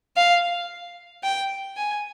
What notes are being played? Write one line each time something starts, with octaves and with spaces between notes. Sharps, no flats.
F5
G5
G#5